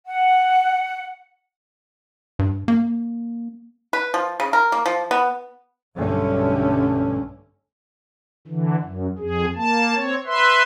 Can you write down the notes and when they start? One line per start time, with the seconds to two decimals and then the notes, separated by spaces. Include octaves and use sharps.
0.07 F#5
2.39 G2
2.68 A#3
3.93 B4
4.14 F3
4.40 C#3
4.53 A#4
4.72 A#3
4.86 F3
5.11 B3
5.97 B1 G2 D3 A3 C#4
8.47 D3 E3
8.82 F#2
9.18 F2 G#4
9.55 A#3 A5
9.95 C4 C#5
10.26 B4 E5 C6